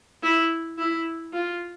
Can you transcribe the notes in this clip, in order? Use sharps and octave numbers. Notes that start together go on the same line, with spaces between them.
E4
E4
F4